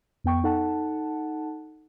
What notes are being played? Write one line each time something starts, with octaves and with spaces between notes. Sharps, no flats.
F2 B3 G5 C#6
D#4 A4 F#5 A5